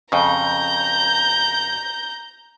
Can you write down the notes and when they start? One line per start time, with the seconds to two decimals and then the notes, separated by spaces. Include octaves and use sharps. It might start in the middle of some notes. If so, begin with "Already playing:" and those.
0.12 F2 C#3 A#5 G6